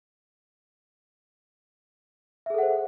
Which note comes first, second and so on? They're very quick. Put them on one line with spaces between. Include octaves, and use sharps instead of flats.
E5 G#4 A4 F#5 C5